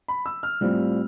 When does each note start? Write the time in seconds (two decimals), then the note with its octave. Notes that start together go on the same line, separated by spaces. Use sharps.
0.08 B5
0.26 E6
0.43 F6
0.61 A2 G3 C4 F4